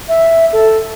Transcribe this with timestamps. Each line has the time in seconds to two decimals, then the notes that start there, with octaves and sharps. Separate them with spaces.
0.08 E5
0.53 A4